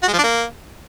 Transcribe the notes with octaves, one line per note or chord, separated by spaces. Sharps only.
F#4
G#3
F3
D4
A#3